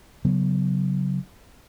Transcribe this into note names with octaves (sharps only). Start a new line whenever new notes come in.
C#3 F#3 B3